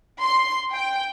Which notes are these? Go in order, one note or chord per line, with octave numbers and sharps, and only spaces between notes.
C6
G5